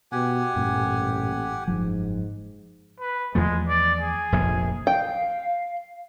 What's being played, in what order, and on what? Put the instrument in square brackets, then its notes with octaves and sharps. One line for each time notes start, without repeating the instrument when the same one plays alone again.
[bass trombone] B2 [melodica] G4 F#5 G#5
[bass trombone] A1 [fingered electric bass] G2 A#2
[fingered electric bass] F#1 F3 [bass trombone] G#2
[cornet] B4
[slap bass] E2 F3 A3 [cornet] G#3
[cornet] D5
G#4
[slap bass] F1 A#1 F2
[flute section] F5 [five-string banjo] G5